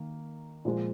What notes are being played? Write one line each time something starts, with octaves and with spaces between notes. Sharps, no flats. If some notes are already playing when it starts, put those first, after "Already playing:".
Already playing: D#3 A#3
A#2 F3 G#3